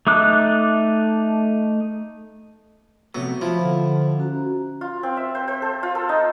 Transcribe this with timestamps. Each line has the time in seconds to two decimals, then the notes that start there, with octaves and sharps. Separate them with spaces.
0.07 A3 D#4 D6 F#6
3.15 C3 F#3 A3 B3
3.41 F3 E4 F4
3.58 D3 C5
4.18 C#4 F#4 A#5
4.81 F4
5.03 C4
5.17 E5
5.35 C5
5.48 C5
5.62 A4
5.83 F4
5.95 A4
6.09 D#4